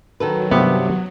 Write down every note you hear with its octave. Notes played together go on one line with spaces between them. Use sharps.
D#3 F#3 A4 B4
G2 C3 B3 G4